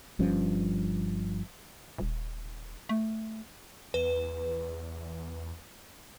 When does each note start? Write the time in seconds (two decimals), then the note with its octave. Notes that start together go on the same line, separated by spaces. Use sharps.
0.19 G1 G2 F3 C#4
1.98 D#1
2.89 A3
3.94 E2 B4